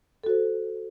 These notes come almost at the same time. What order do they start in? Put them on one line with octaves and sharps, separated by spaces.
A4 F#4 C5